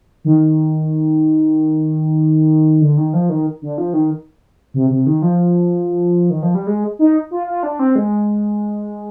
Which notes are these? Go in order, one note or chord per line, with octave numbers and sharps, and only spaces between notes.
D#3
D3
D#3
F3
D#3
D3
F3
D#3
C3
C3
D#3
F3
D#3
F3
G3
G#3
D#4
F4
F4
D4
C4
G#3